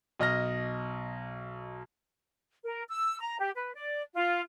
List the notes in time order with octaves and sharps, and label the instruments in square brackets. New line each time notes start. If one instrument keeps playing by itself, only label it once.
[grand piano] B1 D#5 F6 A#6
[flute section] A#4
E6
A#5
G4
B4
D5
F4